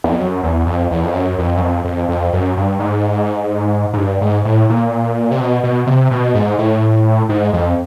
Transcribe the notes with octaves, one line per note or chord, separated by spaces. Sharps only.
E2
F2
F#2
E2
F2
E2
F2
F#2
F2
F#2
F2
F2
F2
F#2
G2
G#2
G#2
G2
G#2
A2
A#2
C3
B2
B2
C3
B2
G#2
A2
G#2
F2